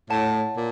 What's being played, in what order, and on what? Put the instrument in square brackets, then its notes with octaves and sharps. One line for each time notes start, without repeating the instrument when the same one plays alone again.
[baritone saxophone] A2 [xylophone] C#5 F#5 A5
[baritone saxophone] A#2